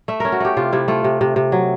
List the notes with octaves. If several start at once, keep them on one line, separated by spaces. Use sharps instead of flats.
A3 E5
C#4 A#4
F#4
A3 G4
C3 F4
C3 E4
A3 F4
C3
C3
C3
F#3